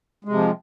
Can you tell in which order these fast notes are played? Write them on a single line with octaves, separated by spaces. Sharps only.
G#3 C3 F3